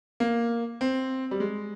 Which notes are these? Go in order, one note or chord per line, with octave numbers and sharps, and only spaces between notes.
A#3
C4
G3
G#3